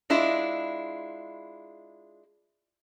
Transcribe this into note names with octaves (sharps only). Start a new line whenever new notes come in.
G#3 D4 E4 F4